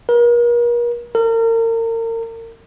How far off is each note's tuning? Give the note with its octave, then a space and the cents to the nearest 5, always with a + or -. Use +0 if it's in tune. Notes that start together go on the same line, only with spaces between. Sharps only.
A#4 +40
A#4 -35